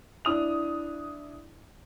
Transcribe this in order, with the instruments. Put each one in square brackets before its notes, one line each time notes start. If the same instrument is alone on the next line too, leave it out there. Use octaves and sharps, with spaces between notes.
[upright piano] D4 E4 D#6 F7